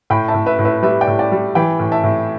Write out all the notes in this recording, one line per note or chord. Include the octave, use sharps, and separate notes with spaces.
A2 G5 B5
E5 A5
A2
B4 E5
A2
B4 E5
G3 B4 E5
D5 G5
A2
D5 G5
G3
E3 G5 B5
A2
E5 A5
A2